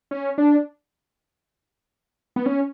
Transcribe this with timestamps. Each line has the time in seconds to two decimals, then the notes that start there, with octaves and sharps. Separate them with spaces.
0.11 C#4
0.38 D4
2.36 B3
2.46 C#4